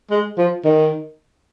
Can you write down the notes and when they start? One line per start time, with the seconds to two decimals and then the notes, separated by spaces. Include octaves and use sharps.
0.11 G#3
0.38 F3
0.64 D#3